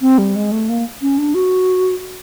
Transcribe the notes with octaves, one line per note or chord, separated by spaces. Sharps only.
C4
G3
G#3
A3
A#3
C#4
D4
F#4